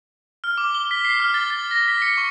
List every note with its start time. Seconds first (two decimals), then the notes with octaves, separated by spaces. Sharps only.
0.44 F6
0.57 D6
0.75 G7
0.91 B6
1.05 C7
1.20 F6
1.34 A6
1.50 A6
1.71 A#6
1.88 B6
2.02 C#7
2.17 C#6